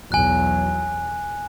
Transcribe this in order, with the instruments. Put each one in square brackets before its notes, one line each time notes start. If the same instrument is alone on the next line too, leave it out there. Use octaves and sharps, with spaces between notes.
[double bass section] B1 E2 F#3 [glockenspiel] G#5 F#6